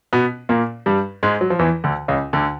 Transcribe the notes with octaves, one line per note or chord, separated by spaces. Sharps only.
B2 B3
A#2 A#3
G2 G3
G#2 G#3
F#3
F3
E2 E3
D2 D3
C#2 C#3
D2 D3